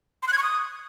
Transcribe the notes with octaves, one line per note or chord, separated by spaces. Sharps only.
C6
F#6
G#6
C#6
D#6